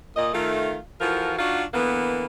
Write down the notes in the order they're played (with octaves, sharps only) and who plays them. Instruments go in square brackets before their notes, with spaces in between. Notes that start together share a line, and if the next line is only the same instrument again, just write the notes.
[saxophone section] A#2 D#5
D#3 A3 F4
E3 F3 F4 F#4 A4 A#4
D4 D#4 F4 F#4
D3 E3 A#3 B3